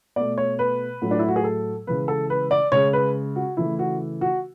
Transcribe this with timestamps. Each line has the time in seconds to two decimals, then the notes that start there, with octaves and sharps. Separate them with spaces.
0.16 B2 A3 D5
0.38 C#5
0.59 B4
1.02 A2 F#3 A3
1.11 D4
1.19 E4
1.28 F#4
1.36 G#4
1.44 A4
1.87 C#3 E3 G#3 B4
2.08 A4
2.30 B4
2.51 D5
2.72 C#3 G#3 C#5
2.93 B4
3.36 F#4
3.57 C#3 E3 A3 E4
3.79 F#4
4.21 F#4